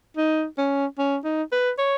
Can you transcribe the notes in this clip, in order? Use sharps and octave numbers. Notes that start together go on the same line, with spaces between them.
D#4
C#4
C#4
D#4
B4
C#5